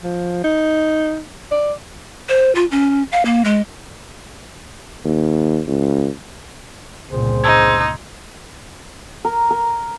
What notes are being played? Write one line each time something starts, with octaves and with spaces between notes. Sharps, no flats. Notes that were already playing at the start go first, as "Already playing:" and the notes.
F3
D#4
D5
C5
F4
C#4
F5
A#3
G#3
D#2
C#2
G1 C#2 A#2 C4 G#4 C5
D#4 C6 E6 G#6
A#4
A#4